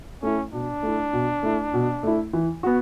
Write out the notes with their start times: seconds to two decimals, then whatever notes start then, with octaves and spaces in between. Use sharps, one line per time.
0.22 A3 C#4 E4
0.53 B2 D4
0.83 A3 E4
1.13 B2
1.43 A3 E4
1.73 B2
2.03 A3 E4
2.33 E3
2.63 B3 F#4